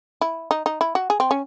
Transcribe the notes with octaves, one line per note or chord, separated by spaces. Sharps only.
E4
D#4
D#4
E4
F#4
G#4
C4
C#4